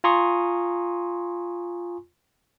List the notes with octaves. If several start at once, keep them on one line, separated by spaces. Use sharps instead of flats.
F4 G#5 A#5 C6 C#6 D#6